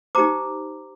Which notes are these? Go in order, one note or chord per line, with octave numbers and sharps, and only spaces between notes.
D#4 G4 C5 A#5 D6